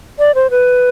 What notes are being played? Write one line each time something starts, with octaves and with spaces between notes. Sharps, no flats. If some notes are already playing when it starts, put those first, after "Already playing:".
D5
C5
B4